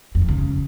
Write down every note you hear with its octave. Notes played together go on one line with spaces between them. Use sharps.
F2
G2
C#3